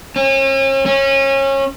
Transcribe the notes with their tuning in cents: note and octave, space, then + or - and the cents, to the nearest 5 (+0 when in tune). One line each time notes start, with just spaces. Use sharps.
C#4 -40
C#4 -25